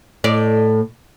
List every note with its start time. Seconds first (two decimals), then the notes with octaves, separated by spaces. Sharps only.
0.24 A2 D5